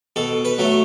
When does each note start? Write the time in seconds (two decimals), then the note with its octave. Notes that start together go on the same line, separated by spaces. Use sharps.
0.16 B2 A4
0.45 B4
0.58 F#3 A3